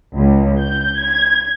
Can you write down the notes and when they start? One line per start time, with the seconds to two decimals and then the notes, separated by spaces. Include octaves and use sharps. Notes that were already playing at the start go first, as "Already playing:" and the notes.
0.16 C#2
0.62 G6
0.99 G#6